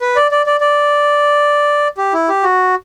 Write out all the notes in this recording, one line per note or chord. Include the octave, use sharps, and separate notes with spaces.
B4
D5
D5
D5
D5
G4
E4
G4
F#4